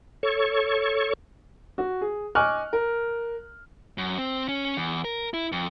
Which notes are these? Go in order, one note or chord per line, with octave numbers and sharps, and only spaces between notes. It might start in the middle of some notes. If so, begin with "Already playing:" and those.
A4 C#5 C#6
F#4
G#4
D#5 G#5 C#6 D6 F6 F#6
A#4
F#2
C4
C#4
E2
A#4
E4
F2